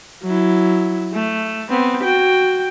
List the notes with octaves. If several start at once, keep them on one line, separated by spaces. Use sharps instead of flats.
F#3 E4
A3
B3 C4
F#4 G5